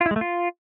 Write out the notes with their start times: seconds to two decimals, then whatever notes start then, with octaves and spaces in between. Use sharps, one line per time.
0.01 F4
0.06 E4
0.11 G#3
0.16 A3
0.21 F4